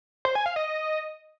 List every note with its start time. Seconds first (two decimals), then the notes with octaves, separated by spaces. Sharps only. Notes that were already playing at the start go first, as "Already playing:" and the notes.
0.25 C5
0.35 G#5
0.46 F5
0.56 D#5